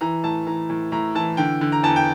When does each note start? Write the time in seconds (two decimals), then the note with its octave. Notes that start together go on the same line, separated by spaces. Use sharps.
0.01 E3 A#5
0.24 A2 A5
0.47 E3 A#5
0.70 A2
0.92 A2 A#5
1.15 E3 A5
1.37 D3 G5
1.61 D3
1.72 A#5
1.83 E2 A5
1.96 G5